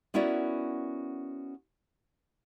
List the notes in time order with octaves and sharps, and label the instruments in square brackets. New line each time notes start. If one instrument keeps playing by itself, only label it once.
[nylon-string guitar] B3 C#4 E4 F#4 A#4 D5